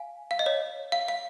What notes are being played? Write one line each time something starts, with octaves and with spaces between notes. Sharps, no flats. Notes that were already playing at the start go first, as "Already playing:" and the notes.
Already playing: F5 G#5
F5
D#5
C#5
F5
F5